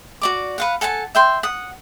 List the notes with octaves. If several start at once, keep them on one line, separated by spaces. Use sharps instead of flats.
F#4 D5 D6
B4 F5 F#5
A4 F#5 G#5 A5
E5 G5 C6
F#5 D#6